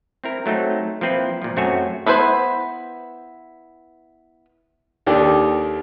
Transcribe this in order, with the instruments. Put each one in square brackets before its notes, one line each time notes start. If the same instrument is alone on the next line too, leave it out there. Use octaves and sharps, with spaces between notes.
[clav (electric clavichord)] C4 E4 A#4
F#3 A3 C4 D#4
F3 A#3 C4 E4 B4
A#2 F3
F#2 A3 C4 F#4 C#5 G#5
[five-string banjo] B3 E4 B4 C5
[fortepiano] D#2 D#3 D4 G4 A4 D5